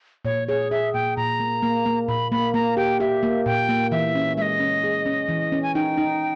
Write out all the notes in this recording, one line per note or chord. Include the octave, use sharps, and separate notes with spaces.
A#2 C#5
G#4 C#5
G#4 E5
A#2 G5
A#2 A#5
A#3
A#3
A#3
A#2 B5
A#3 B5
A#3 A#5
G4 G5
G4 E5
A#3
A#2 G5
A#3
E3 E5
C#4
G#3 D#5 E5
C#4
G#4
C#4
E3
C#4
G#5
D#4 G5
D#4